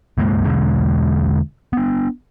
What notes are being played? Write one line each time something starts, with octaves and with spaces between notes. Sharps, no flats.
C#2 G2 G#3 A#3
E2 B2 D3 G#3
B3 D4